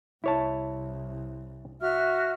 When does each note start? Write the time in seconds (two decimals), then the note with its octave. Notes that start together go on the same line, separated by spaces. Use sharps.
0.24 C2 E4 C#5 A5
1.81 F#4 E5 F6